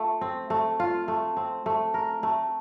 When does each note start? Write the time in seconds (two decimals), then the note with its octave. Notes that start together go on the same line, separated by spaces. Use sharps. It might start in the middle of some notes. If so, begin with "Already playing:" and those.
Already playing: A3 F4
0.21 C4
0.50 A3
0.80 F4
1.08 A3
1.37 C4
1.66 A3
1.94 A#4
2.23 A3